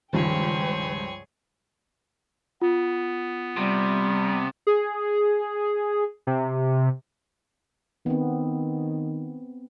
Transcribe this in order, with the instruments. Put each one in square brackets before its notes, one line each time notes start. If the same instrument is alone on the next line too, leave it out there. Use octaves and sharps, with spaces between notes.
[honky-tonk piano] C#2 G2 F3 [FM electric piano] D#3 [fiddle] G#4 C#5 [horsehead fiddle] C5 G5
[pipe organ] B3 [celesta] F4
[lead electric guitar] C3 [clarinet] G3
[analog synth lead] G#4
C3
[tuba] D#3 [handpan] B3 C4